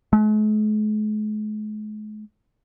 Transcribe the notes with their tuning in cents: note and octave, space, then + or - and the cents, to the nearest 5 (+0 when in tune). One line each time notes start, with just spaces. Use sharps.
G#3 +45